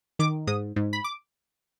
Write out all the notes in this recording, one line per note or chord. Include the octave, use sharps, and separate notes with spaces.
D#3 D6
G#2 D#6
G#2
B5
D6